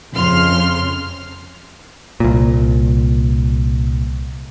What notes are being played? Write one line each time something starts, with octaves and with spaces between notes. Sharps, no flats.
F2 C#3 C6 F6
C2 A#2